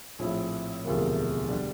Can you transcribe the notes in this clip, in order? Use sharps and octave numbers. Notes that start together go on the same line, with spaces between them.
A#1 A2 F3 C4 E4
E1 D2 C3 F3 A#3
D3 G3 D4